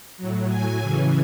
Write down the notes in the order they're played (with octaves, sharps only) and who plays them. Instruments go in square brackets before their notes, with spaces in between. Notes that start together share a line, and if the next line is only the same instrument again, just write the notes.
[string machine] A2 F#3
G#5
C#3 E3